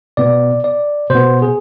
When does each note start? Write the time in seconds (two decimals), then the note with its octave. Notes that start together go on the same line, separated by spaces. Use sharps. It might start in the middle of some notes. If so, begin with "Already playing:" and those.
0.17 B2 B3 D5
0.64 D5
1.10 B2 B3 C5
1.42 G#4